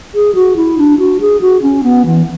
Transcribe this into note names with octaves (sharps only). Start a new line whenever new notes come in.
G#4
F#4
E4
D4
F#4
G#4
F#4
C#4
B3
E3